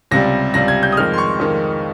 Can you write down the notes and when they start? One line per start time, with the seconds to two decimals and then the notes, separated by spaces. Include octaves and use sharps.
0.11 C#2 C3 G3 A#6
0.54 C#2 C3 G3 A#6
0.68 G#6
0.83 G6
0.92 D#6
0.97 F2 D#3 G#3 F6
1.13 C6
1.18 C#6
1.39 F2 D#3 G#3